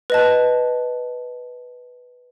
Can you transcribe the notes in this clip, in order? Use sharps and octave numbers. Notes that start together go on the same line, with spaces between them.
B4 D#5 A5